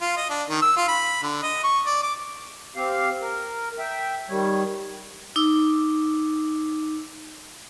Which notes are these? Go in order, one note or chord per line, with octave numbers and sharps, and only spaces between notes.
F4
D#5
D4
D#3
E6
F4
B5
D3
D#5
C#6
D5
D6
C4 G4 F5
A#4
E5 G5
D#3 G3 C#5
D#4 D6 E6